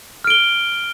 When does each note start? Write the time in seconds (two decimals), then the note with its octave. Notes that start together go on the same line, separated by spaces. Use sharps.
0.24 F6
0.27 D7
0.30 G7